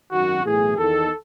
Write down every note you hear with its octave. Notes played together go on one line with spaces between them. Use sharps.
G#1 F#2 D#3 F#4
B1 A2 E3 G#4
E2 D#3 A4